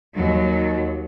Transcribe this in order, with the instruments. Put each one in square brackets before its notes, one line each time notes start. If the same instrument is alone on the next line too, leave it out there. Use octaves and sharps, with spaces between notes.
[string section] D#2 F#3